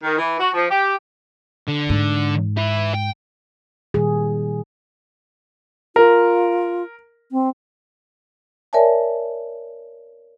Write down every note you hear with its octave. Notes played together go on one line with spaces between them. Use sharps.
D#3
E3
F#4
F3
G4
D3
G#2
E3 E4
G5
A#2 D#3 G3 G#4
F4 A#4
C4
A#4 C#5 D5 E5 G#5 A5